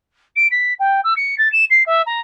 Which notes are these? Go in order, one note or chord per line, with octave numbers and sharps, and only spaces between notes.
D7
B6
G5
E6
C#7
A6
E7
C7
E5
A#5